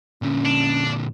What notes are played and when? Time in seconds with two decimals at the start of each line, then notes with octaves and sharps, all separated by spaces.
0.22 A#2 D3 C#4
0.45 D4